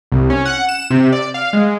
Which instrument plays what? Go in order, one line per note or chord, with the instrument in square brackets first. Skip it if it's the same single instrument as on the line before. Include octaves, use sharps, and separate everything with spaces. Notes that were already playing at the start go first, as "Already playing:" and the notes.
[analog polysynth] C2
C#4
F#5
E7
C3
D5
F5
G#3